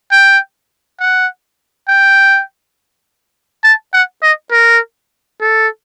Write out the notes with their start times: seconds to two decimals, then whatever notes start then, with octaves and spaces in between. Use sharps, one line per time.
0.12 G5
1.00 F#5
1.89 G5
3.64 A5
3.93 F#5
4.23 D#5
4.52 A#4
5.41 A4